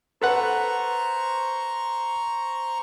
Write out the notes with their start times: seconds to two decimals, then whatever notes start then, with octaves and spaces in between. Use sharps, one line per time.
0.22 A4 B4 C5 F#5 A#5 C#6